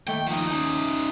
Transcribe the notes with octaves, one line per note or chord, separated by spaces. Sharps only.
D#2 A3 G5
F3 D#4
C#4 D#4